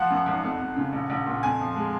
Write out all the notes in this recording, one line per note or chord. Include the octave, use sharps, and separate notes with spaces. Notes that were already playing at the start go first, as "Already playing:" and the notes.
Already playing: F3 F#5
F#2
G#1
F2
F2
C#3
A#1
A#1
A#2
F2 G#5
F3
G#3